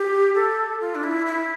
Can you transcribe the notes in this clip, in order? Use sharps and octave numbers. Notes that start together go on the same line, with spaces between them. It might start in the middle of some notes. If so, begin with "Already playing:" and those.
Already playing: G4
A4
F4
D4
E4
E4